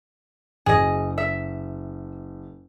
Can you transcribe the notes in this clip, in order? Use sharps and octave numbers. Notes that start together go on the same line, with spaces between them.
F#1 G#4 D#5
E5